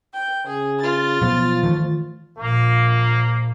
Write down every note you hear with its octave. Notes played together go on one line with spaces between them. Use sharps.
G5
C#3 G#4
F4 A6
B2 F3 F#3 B3
D#3 E3 A3
A#1 A#3